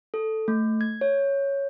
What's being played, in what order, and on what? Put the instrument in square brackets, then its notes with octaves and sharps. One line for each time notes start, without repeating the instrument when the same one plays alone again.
[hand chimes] A4
A3
G#6
C#5